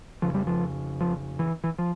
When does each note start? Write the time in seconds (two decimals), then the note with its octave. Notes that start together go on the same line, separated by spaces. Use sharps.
0.22 F2 C#3 F3
0.34 G3
0.47 F3
1.01 F3
1.39 E3
1.64 E3
1.79 F3